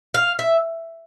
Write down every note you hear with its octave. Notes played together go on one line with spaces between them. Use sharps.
F5
E5